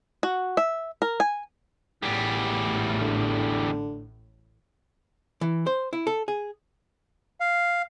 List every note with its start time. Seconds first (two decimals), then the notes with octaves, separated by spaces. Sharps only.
0.23 F#4
0.57 E5
1.02 A#4
1.20 G#5
2.03 A1 E2 A2 G3
3.00 D3
5.41 E3
5.67 C5
5.93 E4
6.07 A4
6.28 G#4
7.40 F5